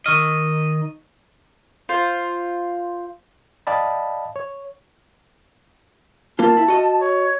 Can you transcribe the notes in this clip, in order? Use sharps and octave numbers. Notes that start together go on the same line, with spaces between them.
D#3 D#5 C#6 E6 F6
F4 C5
D5 D#5 F5 G5 A5 B5
C#5
A#3 F4 A5
E4
F#4 D#5
C#5